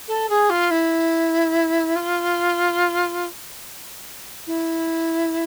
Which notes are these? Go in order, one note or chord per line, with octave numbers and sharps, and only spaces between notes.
A4
G#4
F4
E4
F4
E4